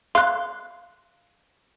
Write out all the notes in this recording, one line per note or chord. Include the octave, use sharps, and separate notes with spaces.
F5 C6 F#6